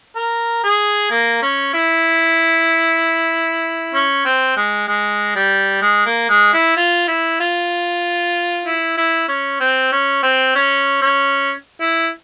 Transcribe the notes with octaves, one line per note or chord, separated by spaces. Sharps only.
A#4
G#4
A#3
C#4
E4
C#4
C4
G#3
G#3
G3
G#3
A#3
G#3
E4
F4
E4
F4
E4
E4
C#4
C4
C#4
C4
C#4
C#4
E4